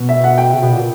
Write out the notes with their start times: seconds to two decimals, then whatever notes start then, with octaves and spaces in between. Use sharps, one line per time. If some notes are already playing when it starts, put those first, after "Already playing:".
Already playing: B2
0.09 E5
0.24 F#5
0.38 G5
0.53 C#3
0.63 B2
0.72 A#2